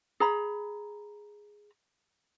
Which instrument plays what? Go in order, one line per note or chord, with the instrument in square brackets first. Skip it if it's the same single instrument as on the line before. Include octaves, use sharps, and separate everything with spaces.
[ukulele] G#4 A#5 B5